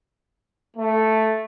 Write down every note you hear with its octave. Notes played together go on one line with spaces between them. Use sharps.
A3